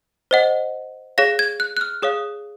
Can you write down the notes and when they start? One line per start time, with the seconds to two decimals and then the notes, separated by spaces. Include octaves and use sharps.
0.31 C5 D#5 F#5
1.18 G#4 C#5 F5 A#6
1.39 G#6
1.60 F#6
1.77 F#6
1.81 F6
2.02 G#4 C#5 F5 D#6